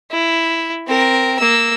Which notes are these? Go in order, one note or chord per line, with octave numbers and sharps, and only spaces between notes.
E4
C4 A#4
A#3 E6